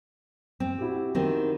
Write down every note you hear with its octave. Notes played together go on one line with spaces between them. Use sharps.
C4
E4 F#4 G4
D#3 C4